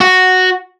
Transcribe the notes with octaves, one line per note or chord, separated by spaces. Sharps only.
F#4